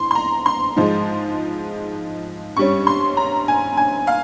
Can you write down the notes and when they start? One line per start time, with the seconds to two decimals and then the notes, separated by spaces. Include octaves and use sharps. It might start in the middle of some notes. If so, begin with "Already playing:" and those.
Already playing: E3 C6
0.11 C6
0.15 A#5
0.46 C6
0.76 G#2 F3 G#3
2.57 G2 G3 C#4 C#6
2.87 C6
3.17 A#5
3.48 G#5
3.77 G#5
4.07 F5